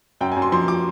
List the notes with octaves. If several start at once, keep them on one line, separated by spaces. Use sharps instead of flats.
F#2 G5
G#5
F#2
C6
F3 C6
D6